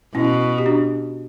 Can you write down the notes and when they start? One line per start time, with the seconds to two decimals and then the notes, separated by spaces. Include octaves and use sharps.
0.15 B2 C#4 E4
0.58 G4
0.66 D4 F#4